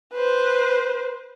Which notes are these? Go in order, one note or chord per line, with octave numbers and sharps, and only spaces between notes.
B4 C5